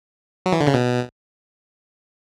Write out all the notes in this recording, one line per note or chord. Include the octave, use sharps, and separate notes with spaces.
F#3
E3
D3
C#3
B2